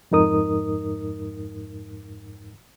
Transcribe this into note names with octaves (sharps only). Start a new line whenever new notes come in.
F2 G#2 D#4 A#4 D#6